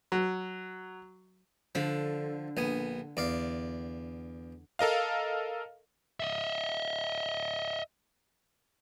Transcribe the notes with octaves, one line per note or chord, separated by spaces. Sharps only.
F#3
D3 F3
A#1 B3 G#5
E2 D5 F5
A4 A#4 D#5 F5
D#5 E5